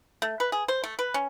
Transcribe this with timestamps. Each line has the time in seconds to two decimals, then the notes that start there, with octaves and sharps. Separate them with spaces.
0.22 A3
0.40 B4
0.52 G#4
0.68 C5
0.84 A3
0.99 B4
1.14 C#4